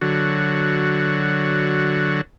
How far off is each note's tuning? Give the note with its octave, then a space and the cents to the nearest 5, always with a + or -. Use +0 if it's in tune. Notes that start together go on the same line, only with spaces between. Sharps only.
D3 +0 F#3 -5 F#4 +0